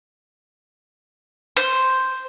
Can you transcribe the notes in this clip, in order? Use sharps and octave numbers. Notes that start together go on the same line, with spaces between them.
C5